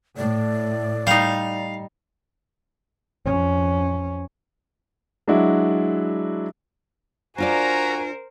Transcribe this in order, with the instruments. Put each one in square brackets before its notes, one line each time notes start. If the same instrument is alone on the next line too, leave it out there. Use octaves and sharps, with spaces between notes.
[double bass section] A2 [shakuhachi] D5
[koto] G3 D#4 [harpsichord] F5
[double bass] F2 C#4
[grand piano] F#3 G#3 D4 E4 F#4
[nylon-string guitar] D4 F4 D5 [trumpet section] F#4 A#5 [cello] A#4 C5 [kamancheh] G#5